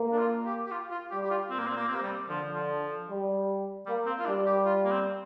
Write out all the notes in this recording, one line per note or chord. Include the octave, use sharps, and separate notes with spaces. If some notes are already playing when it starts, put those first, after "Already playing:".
Already playing: A#3
D4
F4
G4
G4
F4
F4
G3 G4
G4
F4
A#2 C4
A#3
C4
A#3
C3 C4
A#3
G3
D3 F3
F3
G3
G3 A#3
C4
F4
G3 D4
G4
F4
A#3
C4